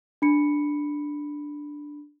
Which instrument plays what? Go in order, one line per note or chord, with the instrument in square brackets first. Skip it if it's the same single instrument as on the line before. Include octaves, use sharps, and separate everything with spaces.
[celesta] D4 B5 C#7